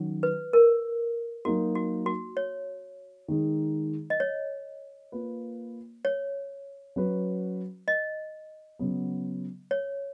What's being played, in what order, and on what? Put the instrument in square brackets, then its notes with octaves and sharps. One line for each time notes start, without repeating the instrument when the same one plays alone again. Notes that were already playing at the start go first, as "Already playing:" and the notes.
Already playing: [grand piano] D#3 F#3 C#4 F#4
[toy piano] B4
A#4
[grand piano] F#3 A#3 D#4 A#4 [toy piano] F#4
[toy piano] F#4
F#4
C#5
[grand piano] D#3 G#3 D#4
[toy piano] D#5
C#5
[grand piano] A#3 F4 B4
[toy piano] C#5
[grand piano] F#3 C#4 F#4 B4
[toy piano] D#5
[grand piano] C#3 F#3 B3
[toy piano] C#5